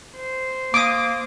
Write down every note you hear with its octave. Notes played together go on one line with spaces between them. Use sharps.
C5
A#3 D6 D#6